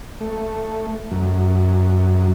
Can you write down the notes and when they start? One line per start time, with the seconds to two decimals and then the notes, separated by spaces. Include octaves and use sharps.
0.21 A3
1.11 F#2